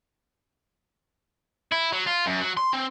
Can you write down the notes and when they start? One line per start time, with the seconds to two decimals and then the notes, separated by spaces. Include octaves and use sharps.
1.72 E4
1.92 F#3
2.06 F4
2.26 F#2
2.41 F#3
2.57 C6
2.73 C4